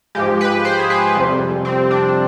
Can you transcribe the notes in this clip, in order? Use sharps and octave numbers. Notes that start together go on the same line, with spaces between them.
G#2 F3 G#3 G4
B4
C5
G#4
B4
F2 C3 G3
C4
D4